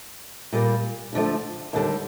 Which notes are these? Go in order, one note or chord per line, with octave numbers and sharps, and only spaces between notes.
A#2 G3 A#3
D2 D3 F3 A3
D#2 D3 G3